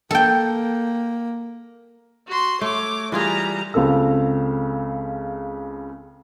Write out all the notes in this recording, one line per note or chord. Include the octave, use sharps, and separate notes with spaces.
A#3 A4 G5
F#4 C6
A3 C#5 D6
E3 G3 F4 G#4 A#5
C#2 C#3 C4 A4 E6